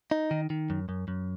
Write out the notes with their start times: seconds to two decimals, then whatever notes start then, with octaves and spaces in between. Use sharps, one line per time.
0.11 D#4
0.31 D#3
0.50 D#3
0.70 F#2
0.89 F#2
1.08 F#2